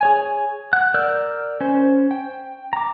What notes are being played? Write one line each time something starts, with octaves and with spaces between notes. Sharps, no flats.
G#4 C#5 G#5
F#5 F#6
A#4 D5 E6 F6 G6
C#4 C5
G5
A#5 D6